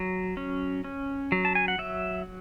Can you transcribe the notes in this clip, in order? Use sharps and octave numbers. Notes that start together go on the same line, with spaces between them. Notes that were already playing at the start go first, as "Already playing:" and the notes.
Already playing: F#3
C#4
C#4
F#3
A5
G#5
F#5
F#3 E5